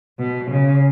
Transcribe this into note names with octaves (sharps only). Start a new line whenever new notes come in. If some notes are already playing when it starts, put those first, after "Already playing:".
B2
C#3